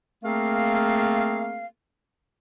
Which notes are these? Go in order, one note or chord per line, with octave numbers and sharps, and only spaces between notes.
A3 A#3 C4 G#4 A#4 F5